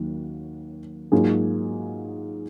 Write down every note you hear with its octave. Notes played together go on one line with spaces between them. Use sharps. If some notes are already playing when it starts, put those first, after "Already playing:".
Already playing: D#2 F#3 A#3 D#4
G#2 F#3 A#3 F4 G#4